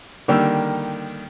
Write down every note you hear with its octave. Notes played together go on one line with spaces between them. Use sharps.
D3 D#3 G3 A#3 G5 E6